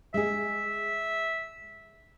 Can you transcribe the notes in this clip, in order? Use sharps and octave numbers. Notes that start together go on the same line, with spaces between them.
G#3 G#4 E5